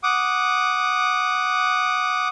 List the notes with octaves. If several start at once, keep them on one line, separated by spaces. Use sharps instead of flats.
F#5 D6 D#6